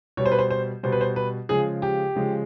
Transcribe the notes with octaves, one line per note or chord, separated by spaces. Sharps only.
B2 G3 C#5
C5
B4
C5
C5
B2 G3 C5
B4
C5
B4
C#3 F3 G#3 G#4
G4
C#3 F3 G#3